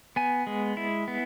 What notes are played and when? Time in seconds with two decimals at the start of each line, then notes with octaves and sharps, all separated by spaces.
0.16 B3 G#5
0.47 G#3
0.77 E4
1.08 B3